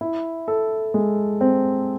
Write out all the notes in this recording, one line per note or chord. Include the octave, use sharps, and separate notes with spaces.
E4
A4
G#3
C4